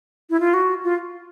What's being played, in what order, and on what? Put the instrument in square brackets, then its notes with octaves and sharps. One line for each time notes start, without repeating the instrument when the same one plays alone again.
[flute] E4
F4
F#4
F4